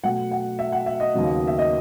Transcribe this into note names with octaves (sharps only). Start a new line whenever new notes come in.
B2 F#3 A3 F#5
F#5
E5
F#5
E5
D#5
D#2 C#3 F#3 B3
E5
D#5